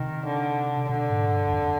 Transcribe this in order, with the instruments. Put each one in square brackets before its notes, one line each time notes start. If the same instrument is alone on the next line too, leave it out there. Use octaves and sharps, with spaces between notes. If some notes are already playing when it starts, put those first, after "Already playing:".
Already playing: [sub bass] C3 [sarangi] D#3
[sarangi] D3
[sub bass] B2 [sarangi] D3
[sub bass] G#2
G2
F#2
F2